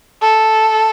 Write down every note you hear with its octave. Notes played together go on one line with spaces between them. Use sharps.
A4